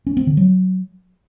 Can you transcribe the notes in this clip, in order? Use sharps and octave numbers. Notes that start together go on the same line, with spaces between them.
C#4
C4
D3
F#3